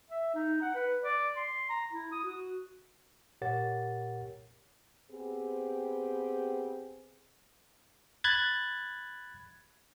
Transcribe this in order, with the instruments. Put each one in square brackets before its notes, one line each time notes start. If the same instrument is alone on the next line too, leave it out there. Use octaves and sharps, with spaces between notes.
[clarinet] E5
D#4
F#5
B4
D5
C6
A#5
E4
D#6
F#4
[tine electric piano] A#2 G4 A#4 C#5 F#5 A6
[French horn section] B3 C4 G4 G#4
[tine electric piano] B5 F#6 G#6 A6